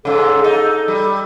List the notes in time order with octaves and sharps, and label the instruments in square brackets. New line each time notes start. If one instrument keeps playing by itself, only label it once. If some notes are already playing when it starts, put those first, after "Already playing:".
[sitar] G#2 C#3 [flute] A4
[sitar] D#4
G3